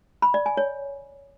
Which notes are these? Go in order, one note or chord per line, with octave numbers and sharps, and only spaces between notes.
B5
D5
G#5
C#5